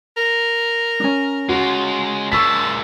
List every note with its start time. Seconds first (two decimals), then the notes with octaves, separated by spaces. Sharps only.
0.17 A#4
1.00 C#4 D4
1.49 G#3 F4 F#4
2.32 A#2 G#3 A5 C#6 E6 B6